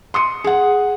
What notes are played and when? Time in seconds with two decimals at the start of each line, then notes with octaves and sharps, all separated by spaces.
0.14 C6 D#6 C#7
0.44 G#4 F#5